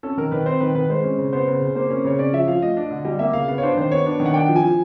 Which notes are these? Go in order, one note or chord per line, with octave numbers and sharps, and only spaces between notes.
C#4 A4
D#3 A#4
D#3 B4
C4 C5
D#3 B4
D#3 B4
G#3 C5
C#4
C#3
B3 C5
C#3
C#3
A#3 C5
C#4
C#3 C#5
C#4 D5
F3 E5
F3 F5
A3 D#5
D4
D3
G3 D#5
A#3 E5
C#3 F5
B3 F5
C#5
D4 C5
D#3 C5
B3 C#5
D4
D#3
F#5
D4 G5
F3
G#5
F3